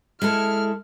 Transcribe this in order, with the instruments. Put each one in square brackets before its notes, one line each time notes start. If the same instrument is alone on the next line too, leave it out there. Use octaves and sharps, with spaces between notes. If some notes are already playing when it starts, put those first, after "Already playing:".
[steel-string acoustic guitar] G#3 E4 A4 [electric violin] F6